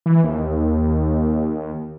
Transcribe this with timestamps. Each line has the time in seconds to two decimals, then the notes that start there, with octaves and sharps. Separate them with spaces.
0.06 E3
0.24 D#2